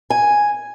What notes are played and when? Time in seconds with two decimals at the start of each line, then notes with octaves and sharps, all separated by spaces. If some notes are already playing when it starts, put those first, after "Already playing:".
0.10 G#5